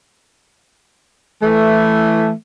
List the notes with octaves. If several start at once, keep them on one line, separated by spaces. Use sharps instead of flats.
E3 A3